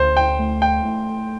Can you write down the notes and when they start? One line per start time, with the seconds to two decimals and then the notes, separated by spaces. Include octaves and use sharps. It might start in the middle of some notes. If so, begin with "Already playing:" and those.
Already playing: D2 C5
0.17 G5
0.39 A3
0.62 G5
0.85 A3